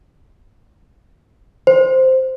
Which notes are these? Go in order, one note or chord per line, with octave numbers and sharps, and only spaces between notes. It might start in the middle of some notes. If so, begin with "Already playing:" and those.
C5